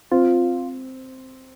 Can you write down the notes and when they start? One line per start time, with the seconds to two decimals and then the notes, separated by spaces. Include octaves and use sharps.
0.11 C4 F4